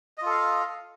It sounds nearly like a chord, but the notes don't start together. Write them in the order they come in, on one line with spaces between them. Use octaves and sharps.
D#5 F4 A4 F5